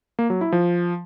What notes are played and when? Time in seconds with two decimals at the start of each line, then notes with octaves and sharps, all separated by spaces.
0.19 A#3
0.30 F#3
0.41 E4
0.52 F3